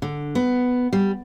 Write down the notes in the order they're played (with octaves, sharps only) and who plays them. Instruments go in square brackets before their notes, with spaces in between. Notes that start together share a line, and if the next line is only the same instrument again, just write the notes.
[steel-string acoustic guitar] D3
B3
G3